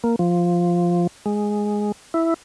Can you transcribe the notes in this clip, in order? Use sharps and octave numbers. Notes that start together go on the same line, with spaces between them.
A#3
F3
G#3
E4